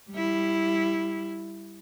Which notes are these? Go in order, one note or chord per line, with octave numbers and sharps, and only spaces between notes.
G3 E4